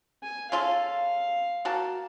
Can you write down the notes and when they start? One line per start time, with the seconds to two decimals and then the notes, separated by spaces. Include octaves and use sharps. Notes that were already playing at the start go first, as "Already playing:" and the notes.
0.23 G#5
0.52 C#3 F4 A4 F5
1.65 A#3 F#4 A5